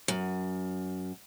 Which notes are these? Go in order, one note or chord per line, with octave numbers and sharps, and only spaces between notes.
F#2